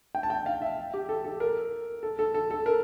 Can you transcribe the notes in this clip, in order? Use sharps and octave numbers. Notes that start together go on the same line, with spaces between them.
G5
A5
G5
F5
E5
G4
A4
A4
A#4
A4
A4
A4
A4
A#4